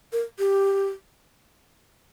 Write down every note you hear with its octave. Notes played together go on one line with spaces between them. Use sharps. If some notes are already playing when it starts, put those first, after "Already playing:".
A#4
G4